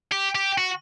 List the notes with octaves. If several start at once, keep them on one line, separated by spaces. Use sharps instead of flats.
G4
G4
F#4